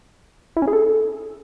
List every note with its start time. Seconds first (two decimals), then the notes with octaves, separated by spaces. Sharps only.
0.57 E4
0.62 C#4
0.68 G#4
0.73 A4